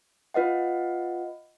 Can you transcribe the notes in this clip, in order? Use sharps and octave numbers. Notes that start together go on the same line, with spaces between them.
F4 B4 D#5 F#5